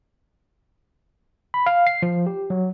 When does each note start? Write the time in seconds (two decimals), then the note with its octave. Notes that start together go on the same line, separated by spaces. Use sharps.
1.54 B5
1.66 F5
1.87 C7
2.02 F3
2.27 G4
2.50 F#3